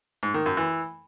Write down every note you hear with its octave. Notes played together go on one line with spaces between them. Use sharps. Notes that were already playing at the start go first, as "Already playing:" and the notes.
G#2
D#3
F#2
E3